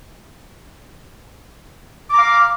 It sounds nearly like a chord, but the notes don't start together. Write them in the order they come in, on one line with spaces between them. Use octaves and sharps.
D6 A#5 F5